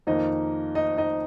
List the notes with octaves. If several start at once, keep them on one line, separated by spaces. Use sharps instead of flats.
F2 D#3 A#3 D#4 D#5
D#4 D#5
D#4 D#5